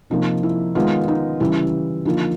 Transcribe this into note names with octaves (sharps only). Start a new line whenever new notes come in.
C3 F3 A#3 D#4
E4
D#3 G#3 B3 D#4 F4
D#4
C#3 E3 G3 E4
D3 F3 A#3 D#4 F4